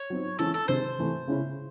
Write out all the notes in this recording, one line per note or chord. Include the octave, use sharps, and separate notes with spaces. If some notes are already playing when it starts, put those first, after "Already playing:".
Already playing: C#5
F#3 C4 D#4
E3 G#3 C#4 E4 A4
A4
C3 D#3 G#3 D#4 C5
C3 E3 A3
C#3 G#3 C#4 E4